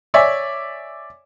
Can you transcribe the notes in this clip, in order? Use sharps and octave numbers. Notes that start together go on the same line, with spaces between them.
C#5 D5 E5 G#5